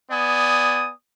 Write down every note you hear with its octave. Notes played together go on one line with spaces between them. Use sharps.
B3 D5 G#5 D#6